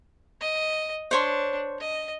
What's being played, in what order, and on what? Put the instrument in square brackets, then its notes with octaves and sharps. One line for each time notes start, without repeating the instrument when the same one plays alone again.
[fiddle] D#5
[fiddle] D4 [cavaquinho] C5 C#5 C6
[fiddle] D#5